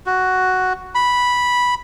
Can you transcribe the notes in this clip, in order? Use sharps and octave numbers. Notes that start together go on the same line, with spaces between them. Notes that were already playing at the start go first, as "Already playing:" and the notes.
F#4
B5